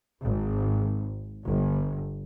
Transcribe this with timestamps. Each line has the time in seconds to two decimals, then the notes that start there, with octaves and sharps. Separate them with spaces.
0.22 G#1
1.45 G1